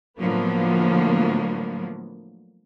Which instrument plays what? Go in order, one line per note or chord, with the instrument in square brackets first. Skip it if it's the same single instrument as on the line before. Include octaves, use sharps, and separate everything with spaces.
[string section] A2 D3 F3 F#3 A#3 B3